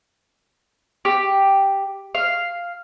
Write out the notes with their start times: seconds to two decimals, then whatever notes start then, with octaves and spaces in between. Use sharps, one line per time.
1.05 G4
2.15 F5